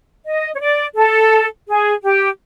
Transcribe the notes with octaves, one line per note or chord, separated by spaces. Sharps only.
D#5
C#5
D5
A4
G#4
G4